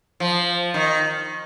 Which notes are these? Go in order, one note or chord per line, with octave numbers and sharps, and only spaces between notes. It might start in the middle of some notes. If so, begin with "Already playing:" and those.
F3
D#3